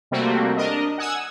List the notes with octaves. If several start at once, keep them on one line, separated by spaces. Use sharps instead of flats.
C3 G3 A3 A#3 C4 F#4
D4 A#4 D#5
F#5 G#5 D#6 E6